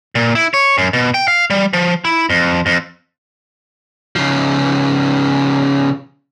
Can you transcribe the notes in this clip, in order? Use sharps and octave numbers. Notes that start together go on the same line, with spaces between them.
A#2
E4
C#5
F#2
B2
G5
F5
G3
F3
E4
F2
F2
C#3 F3